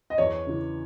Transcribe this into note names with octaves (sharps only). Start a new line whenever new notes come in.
D#5
E2 C#5
C#3 E3